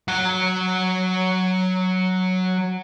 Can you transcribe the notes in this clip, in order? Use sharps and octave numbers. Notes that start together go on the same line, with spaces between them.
F#3 F#5